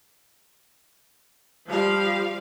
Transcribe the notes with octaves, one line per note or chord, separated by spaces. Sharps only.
F3 G3 F5